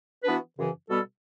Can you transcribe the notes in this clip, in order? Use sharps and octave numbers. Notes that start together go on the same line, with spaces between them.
E3 B3 D4 F#4 B4
F#2 C#3 E3
B2 G3 B3 F#4 A4